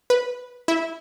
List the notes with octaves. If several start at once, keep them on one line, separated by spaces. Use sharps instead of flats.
B4
E4